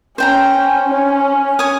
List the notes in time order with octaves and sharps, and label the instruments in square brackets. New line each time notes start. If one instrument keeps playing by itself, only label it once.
[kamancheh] C#4 [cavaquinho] C5 G5 A#5
[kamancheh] C#4
[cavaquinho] C#5 G#5 D#6